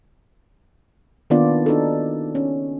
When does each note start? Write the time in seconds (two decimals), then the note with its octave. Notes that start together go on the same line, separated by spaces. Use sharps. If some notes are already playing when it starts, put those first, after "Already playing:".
1.30 D#3 A#3 B3 D4 F4 D5
1.66 D4 D#4 F#4 A4
2.35 C#4